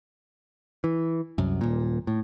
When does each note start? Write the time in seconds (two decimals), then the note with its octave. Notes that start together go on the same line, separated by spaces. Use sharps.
0.84 E3
1.38 C2 F#2
1.61 D#1 A#2
2.07 A2